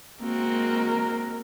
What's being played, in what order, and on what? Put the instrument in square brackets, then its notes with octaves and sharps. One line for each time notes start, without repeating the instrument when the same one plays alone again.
[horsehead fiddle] G#3 A#4 [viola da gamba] A#3 C4 F#4